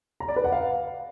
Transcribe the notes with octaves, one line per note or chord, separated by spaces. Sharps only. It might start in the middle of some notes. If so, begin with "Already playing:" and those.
A#5
D5
B4
F#5
F5